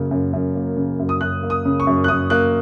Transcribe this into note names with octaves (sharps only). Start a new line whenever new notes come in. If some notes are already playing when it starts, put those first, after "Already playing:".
Already playing: F#2 C#3 A#3
F#2
F#2
A#3
C#3
F#2
D#6
F#2 F#6
A#3
D#6
C#3
C#6
F#2
F#6
F#2 D#6
A#3 F#6